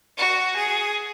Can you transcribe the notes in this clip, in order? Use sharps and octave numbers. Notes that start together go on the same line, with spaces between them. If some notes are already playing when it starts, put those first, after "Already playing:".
F#4
G#4